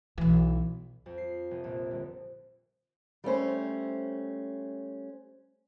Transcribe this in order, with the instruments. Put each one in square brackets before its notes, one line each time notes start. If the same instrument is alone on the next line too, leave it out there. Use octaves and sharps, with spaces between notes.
[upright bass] B1 E3
[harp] F2
C7
F1
A#1
G1
[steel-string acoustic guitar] G3 A3 C#4 C5